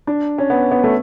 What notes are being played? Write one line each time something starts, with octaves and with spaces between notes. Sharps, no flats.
D4
C#4
B3
B3
A3